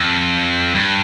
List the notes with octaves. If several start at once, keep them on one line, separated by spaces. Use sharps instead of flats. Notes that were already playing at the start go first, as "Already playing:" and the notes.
Already playing: F2
G2